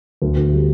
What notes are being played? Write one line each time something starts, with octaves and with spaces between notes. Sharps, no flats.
D2
D2
G3